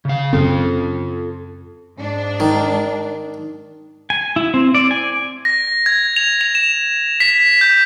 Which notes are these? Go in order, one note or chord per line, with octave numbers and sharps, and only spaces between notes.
C#3 F5
F#2 C#3 C4 F4 A4
G#2 D4
D#3
G#5
E4
C4
D5
G#5
A#6
G#6
F7
F7
E7
B6
G6